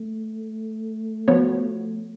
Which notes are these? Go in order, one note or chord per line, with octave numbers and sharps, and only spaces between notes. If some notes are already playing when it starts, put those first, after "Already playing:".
Already playing: A3
F3 B3 F#4 C#5